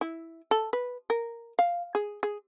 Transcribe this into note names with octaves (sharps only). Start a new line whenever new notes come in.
E4
A4
B4
A#4
F5
G#4
G#4